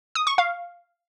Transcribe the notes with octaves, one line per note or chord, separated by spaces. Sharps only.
D#6
C#6
F5